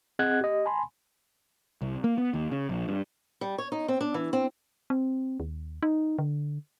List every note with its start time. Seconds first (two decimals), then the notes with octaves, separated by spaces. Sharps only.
0.19 C4 G#4 D#5 F#5 F#6 G#6
0.41 G4 D#5
0.66 G#5 A5 B5 C6
1.82 C2
2.04 A#3
2.18 B3
2.34 D#2
2.51 C#3
2.69 A#1
2.88 G2
3.41 G3
3.58 C#5
3.72 D#4
3.88 C4
4.01 D4
4.14 E3
4.33 C4
4.90 C4
5.40 D#2
5.83 D#4
6.19 D3